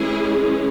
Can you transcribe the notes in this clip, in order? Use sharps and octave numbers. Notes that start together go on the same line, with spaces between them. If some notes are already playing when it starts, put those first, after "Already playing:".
Already playing: E3 G#3 C#4 E4 G#4